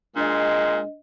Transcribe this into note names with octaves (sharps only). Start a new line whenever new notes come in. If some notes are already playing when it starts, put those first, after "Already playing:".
A#2 G#3 D4 D#5